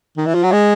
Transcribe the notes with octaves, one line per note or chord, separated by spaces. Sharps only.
D#3
E3
F3
F#3
G#3